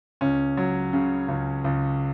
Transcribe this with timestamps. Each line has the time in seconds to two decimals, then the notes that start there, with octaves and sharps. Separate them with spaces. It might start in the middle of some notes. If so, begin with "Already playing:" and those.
0.21 C#2 C#4
0.57 F#3
0.93 C#3
1.28 C#2
1.64 C#2